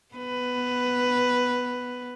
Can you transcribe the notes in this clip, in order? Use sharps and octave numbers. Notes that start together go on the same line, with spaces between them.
B3 B4